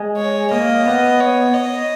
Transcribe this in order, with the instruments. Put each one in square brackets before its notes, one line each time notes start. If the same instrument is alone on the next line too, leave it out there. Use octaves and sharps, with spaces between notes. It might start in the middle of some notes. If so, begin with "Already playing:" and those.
Already playing: [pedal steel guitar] G#3
[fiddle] C#5
[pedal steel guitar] A#3 [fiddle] D#5
[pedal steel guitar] B3
[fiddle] C#5
D#5